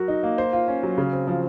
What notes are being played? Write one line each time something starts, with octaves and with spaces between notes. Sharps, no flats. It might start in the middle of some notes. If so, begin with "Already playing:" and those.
Already playing: F#3 F#4 A#4
D#4
A#3
C5
F4
C#4
F#3
C#3
C4
F3